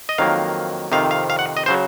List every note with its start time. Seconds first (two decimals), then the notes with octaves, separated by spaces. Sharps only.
0.09 D#5
0.18 F2 D#3 F#3 A#3 F5
0.92 F2 C3 D#3 F5
1.11 F5
1.30 F5
1.39 F#5
1.57 D#5
1.66 C#3 F#3 C5